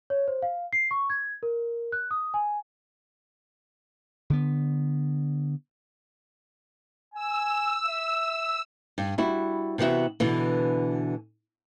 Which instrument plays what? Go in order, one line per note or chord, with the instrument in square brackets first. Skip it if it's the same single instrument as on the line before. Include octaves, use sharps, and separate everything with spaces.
[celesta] C#5
C5
F5
C7
C#6
G#6
A#4
F#6
D#6
G#5
[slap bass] D3 B3
[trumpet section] G#5 [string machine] E6
[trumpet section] E5
[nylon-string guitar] G2
G3 E4 F#4
C3 E3 B3 F#4 E5
B2 D3 E3